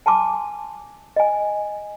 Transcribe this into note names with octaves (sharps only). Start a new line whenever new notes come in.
G#5 A5 C6 D6
D#5 G#5